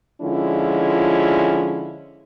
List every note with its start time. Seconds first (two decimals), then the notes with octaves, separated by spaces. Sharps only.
0.22 D3 F3 G#3 C#4 E4 F4